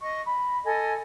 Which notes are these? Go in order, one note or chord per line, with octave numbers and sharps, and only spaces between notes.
D#5 C#6
B5
A4 D#5 G#5